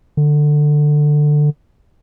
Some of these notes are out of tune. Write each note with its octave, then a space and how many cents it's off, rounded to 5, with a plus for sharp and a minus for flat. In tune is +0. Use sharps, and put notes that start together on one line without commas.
D3 +15